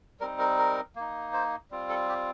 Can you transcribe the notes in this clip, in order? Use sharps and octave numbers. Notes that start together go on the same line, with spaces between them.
G3 C4 D#4 A#4
A#4
A#4
A#3 D#4
C5
G3 C4 F4
A4
G4